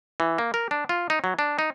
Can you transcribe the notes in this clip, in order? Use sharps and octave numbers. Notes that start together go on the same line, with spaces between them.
E3
A#3
A#4
D4
F4
D#4
F#3
D4
D#4